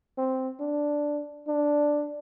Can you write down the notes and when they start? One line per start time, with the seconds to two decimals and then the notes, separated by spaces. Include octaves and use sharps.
0.18 C4
0.60 D4
1.48 D4